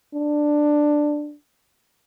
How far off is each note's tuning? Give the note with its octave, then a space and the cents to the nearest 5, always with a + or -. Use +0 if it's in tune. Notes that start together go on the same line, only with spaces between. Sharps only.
D4 +10